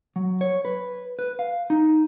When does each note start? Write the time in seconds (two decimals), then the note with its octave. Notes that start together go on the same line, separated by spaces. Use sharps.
0.16 F#3
0.41 C#5
0.65 B4
1.19 B4
1.39 F5
1.70 D#4